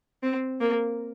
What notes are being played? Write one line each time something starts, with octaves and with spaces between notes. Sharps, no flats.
C4
A#3